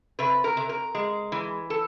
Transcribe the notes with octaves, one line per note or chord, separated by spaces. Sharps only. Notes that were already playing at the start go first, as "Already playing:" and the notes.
C3 B4
A#4
C3
A#4
G#3
E3
A4